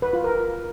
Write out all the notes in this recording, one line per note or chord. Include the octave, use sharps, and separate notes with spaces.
B4
F4
A#4